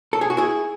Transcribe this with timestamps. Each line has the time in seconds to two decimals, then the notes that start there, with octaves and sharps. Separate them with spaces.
0.13 A4
0.21 G#4
0.30 F#4
0.37 E4 G#4